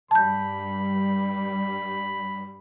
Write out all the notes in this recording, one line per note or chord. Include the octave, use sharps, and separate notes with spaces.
G2 G3 A5 B5 G6